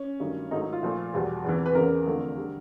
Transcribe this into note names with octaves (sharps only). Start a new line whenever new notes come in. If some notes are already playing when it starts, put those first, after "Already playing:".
Already playing: C#4
G2 D#3 F#3 A3
G#2 D#3 F#3 A3 D#4
D#4
F4
A#2 F3 A3
E2 B2 G3
E2 C3 E3
B4
E2 C#3 E3 A#4
F2 D3 F3 A3
D3 G3